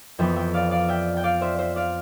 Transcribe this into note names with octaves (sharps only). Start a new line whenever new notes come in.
F2 E3 B3 E5 G5
E5 G5
D5 F5
D5 F5
E5 G5
G5
D5 F5
C5 E5
C5 E5
D5 F5